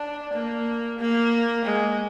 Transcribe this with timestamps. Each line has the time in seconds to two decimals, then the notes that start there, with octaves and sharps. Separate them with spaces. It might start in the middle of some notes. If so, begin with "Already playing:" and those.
Already playing: D4
0.34 A#3
0.99 A#3
1.65 G#3